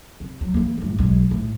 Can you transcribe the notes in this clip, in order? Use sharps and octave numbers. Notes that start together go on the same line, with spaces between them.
C3
F#3
E3 A#3
G1 A2
B1 G#3
A2